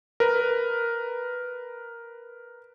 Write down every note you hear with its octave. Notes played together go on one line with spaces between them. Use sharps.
A#4 B4